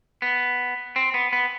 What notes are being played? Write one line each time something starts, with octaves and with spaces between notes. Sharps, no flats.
B3
C4
B3
B3